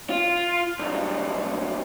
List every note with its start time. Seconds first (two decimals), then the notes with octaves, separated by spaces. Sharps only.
0.10 F4
0.79 B1 G2